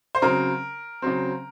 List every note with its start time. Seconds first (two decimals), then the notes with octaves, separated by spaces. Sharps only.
0.15 C5
0.22 C#3 F#3 C4 A#4
1.02 C#3 F#3 C4